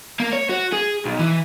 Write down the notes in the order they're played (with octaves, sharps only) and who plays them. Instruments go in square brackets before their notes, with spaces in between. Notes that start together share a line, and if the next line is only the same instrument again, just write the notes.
[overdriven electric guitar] A#3
C#5
F#4
G#4
B1
E3